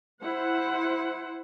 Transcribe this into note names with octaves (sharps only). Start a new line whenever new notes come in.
E4 C5 F#5